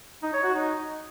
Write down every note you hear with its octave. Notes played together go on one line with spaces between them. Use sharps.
D#4
C#5
F#4
D#4